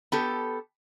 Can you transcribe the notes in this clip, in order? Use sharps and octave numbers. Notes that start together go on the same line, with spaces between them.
B3 G4 A4